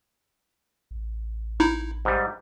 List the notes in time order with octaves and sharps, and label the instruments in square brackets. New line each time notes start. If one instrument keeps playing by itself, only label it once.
[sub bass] A1
[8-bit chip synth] D#4 E4
[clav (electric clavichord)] G#2 G3